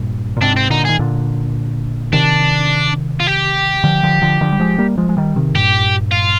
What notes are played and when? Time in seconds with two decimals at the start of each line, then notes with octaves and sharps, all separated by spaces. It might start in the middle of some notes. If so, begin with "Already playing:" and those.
Already playing: G2 A#2
0.37 A#2
0.41 G#2 C3 D4
0.56 C4
0.70 A#2 D3 D#4
0.85 D#3 G#4
0.99 A#2 D3
2.13 C3 D#3 D4
3.20 F4
3.27 G4
3.84 D3 F3
4.03 D3 F3
4.22 D3 F3
4.41 D3 F3
4.52 G3
4.60 F3 G#3
4.78 G3 A#3
4.97 F3 G#3
5.09 G#3
5.17 D#3 G3
5.36 C3 D#3
5.55 G2 A#2 G4
6.12 F4